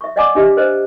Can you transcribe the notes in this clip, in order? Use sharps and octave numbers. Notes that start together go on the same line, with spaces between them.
E5 C#6
D5 D#5 F#5 G#5 A5 D6
D4 G4 D#5 E5
B4 C5 D#5